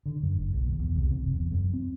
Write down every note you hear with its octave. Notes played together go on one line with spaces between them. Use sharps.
D3
F#2
F#1
B1
D#2
E2
C2
C3
F#1
E2
F#2
C4